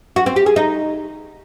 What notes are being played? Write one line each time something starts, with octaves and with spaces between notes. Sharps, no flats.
F#4
C4
G4
G#4
D#4